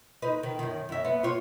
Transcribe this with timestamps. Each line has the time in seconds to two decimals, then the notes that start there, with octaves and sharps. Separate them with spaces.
0.22 D#4 B4
0.43 D#3
0.59 F#2 D#3
0.89 F#2 E5
1.05 B3
1.23 F4 C#5